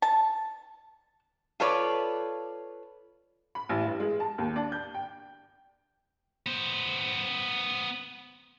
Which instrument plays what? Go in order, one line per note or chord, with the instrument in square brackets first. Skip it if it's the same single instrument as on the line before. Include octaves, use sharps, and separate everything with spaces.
[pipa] A5
[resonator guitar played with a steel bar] F4 A4 B4 C#5 D5
[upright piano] B5
A1
G2
G#3
A5
D#2
D4
G6
G5
[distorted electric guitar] B3 C5